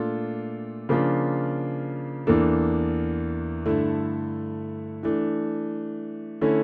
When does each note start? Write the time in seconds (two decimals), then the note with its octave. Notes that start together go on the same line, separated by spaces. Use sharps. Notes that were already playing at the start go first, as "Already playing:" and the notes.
Already playing: A#2 A3 D4 F4 A4
0.89 C#3 F3 A#3 D4 F4
2.27 E2 E3 A#3 D4 A4
3.66 G2 D3 A3 E4
5.03 E3 A3 D4
6.41 D3 A3 C#4 E4